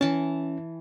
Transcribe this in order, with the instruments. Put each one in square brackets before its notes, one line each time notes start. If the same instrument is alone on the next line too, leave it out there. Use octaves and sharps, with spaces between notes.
[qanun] E3 A5 [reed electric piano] C#4